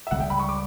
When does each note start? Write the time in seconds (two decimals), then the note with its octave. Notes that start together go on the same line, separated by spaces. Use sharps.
0.07 E5
0.11 C#2 C#3 G3 F#5
0.20 G5
0.30 B5
0.40 C#6
0.49 D6